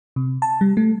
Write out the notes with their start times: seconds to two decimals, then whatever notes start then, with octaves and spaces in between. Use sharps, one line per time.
0.16 C3
0.42 A5
0.61 G3
0.77 A3